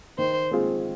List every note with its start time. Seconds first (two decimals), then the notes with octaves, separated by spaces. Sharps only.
0.18 D#3 C5
0.51 G#3 C4 F4 G#4